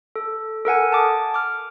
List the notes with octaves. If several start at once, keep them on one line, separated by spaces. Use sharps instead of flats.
A4
A4 A#4 F#5 G#5
A5 D6 D#6
D6 F6